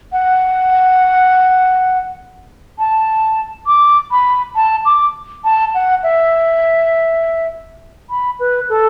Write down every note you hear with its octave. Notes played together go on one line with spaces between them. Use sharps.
F#5
A5
D6
B5
A5
D6
A5
F#5
E5
B5
B4
A4